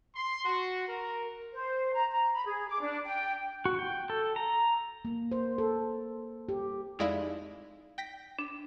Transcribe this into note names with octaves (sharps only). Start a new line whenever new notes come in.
C6
F#4
A#4
C5
A#5
A#5
B5
G#4
D6
D4
G5
F#4
G5
A4
A#5
A#3
C5
A4
G4
F2 G#3 D#4 E4 D5 F5
G5 A#6 B6
D4